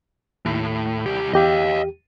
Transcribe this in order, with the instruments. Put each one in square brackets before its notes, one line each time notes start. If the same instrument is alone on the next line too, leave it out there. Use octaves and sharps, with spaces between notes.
[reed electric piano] D#2 [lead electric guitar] A2
[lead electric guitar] C2 G4
[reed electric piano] E2 G4 [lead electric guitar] D#5 F5